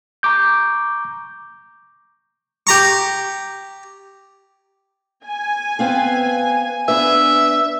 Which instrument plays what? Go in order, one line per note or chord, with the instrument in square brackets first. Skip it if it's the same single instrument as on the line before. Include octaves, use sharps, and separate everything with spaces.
[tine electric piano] A#5 C#6 D6 G6
[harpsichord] G4 A#5 C#6
[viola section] G#5
[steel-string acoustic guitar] B3 C4 F5
[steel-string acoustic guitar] B3 D4 B4 [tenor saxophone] E5